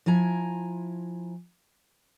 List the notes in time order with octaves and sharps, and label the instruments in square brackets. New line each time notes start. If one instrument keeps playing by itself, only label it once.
[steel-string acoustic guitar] F3 E4 G#5 A#5